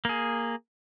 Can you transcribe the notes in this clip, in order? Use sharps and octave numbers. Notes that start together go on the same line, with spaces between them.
A#3 G#4